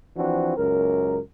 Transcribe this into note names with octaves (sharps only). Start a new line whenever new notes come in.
E3 F3 C4 D4 F#4
C#2 F#2 A#4